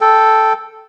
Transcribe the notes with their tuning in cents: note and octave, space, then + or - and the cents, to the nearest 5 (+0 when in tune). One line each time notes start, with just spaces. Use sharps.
A4 +0 G5 +0